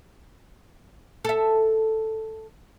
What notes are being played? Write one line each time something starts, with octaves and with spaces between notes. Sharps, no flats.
A4 E5